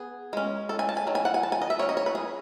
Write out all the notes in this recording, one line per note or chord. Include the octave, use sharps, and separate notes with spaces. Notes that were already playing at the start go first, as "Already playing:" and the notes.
Already playing: B3 G#4
G#3 C#4
A4
G#5
A5
G#5
D#3 F#3
G#5
F#5
G#5
A5
G#5
D#5
E5
F#3 C#4 C#5
D#5
C#5
B4
G#4